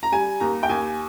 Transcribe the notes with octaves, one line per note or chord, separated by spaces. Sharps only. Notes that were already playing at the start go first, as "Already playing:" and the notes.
A#5
G3 G#5
D#2 A#5
G5
D#2 G#5